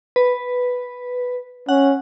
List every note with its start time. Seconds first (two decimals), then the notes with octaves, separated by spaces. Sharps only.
0.16 B4
1.69 C#4 F#5